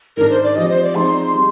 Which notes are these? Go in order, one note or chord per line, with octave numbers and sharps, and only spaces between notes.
G#2 D#3 G#3 D4 A#4
C5
D5
F3 C4 G4 D#5
C5
D5
F3 G#3 C4 D#4 G#4 C6
G3